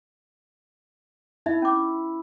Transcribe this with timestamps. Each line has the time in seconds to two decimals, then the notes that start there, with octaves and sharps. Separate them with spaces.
1.46 D#4 E4 E5
1.62 C#4 D6